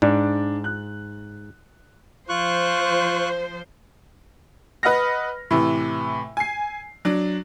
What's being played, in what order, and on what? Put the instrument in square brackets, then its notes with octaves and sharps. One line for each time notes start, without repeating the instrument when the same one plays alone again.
[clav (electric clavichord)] G#2 [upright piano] D4 D5
[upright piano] F#6
[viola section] F3 C5 [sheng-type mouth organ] F4 C#6 F#6
[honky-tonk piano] B4 D#5 F#5 F6 A#6
A2 C3 E3
G#5 C7
F#3 D4